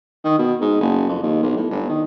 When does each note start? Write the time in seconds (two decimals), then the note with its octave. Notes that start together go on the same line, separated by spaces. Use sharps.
0.24 D#3
0.38 B2
0.61 G#2
0.80 F#1
1.09 F2
1.22 D#2
1.42 B1
1.56 A2
1.71 G1
1.89 D#3